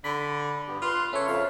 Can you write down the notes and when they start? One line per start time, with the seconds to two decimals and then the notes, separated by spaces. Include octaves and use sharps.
0.04 D3 B5
0.67 G2 B3 G4
0.82 F4 B4 C6 F#6
1.13 C#3 C#4 A4 C#5 E5
1.28 F2 F5